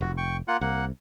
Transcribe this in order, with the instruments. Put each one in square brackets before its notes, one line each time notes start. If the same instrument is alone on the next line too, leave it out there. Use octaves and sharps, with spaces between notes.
[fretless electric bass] F1 [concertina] F#4
[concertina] G5 C#6
A#3 F4 F#5
[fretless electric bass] C2 [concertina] A#3 F#5